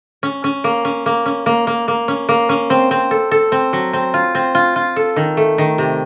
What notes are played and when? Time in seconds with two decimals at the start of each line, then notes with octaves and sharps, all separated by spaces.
0.23 C#4
0.44 C#4
0.64 A#3
0.85 C#4
1.06 A#3
1.26 C#4
1.46 A#3
1.67 A#3
1.88 A#3
2.08 C#4
2.29 A#3
2.49 C#4
2.70 C4
2.91 C4
3.11 A4
3.31 A4
3.52 C4
3.73 F#3
3.93 C4
4.14 F4
4.35 C4
4.55 F4
4.76 F4
4.96 A4
5.16 D#3
5.37 A3
5.58 D#3
5.78 C3